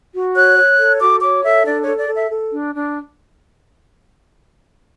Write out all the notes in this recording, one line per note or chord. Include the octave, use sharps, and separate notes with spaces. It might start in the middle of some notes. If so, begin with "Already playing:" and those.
F#4
C#5 F#6
C#5
A4
F#4 D6
C#5 D6
A4 E5
D4 D5
A4 C#5
D5
A4
E5
A4
D4
D4